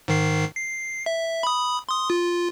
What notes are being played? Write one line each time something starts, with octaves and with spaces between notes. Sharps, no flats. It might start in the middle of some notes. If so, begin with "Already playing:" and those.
G#2 D#3 C7
C7
E5
B5 D#6
C6 D#6
F4